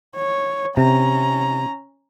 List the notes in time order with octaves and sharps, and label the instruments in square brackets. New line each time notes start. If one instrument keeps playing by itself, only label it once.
[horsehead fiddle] C#5
[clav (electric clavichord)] C3 [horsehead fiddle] C#4 A#5